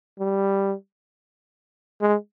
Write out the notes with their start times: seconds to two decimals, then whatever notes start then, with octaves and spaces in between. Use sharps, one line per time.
0.19 G3
2.01 G#3